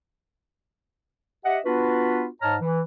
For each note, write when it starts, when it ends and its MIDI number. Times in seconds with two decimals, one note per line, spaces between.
1.44 1.58 67
1.44 1.58 75
1.44 1.58 76
1.44 1.58 78
1.65 2.26 59
1.65 2.26 62
1.65 2.26 65
1.65 2.26 66
1.65 2.26 71
2.41 2.55 44
2.41 2.55 73
2.41 2.55 75
2.41 2.55 81
2.41 2.55 82
2.41 2.55 89
2.61 2.80 52